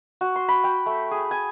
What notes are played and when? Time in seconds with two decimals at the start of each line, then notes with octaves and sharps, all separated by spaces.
0.21 F#4
0.36 C6
0.48 B5
0.64 G5
0.86 A3
1.11 G#4
1.31 G#5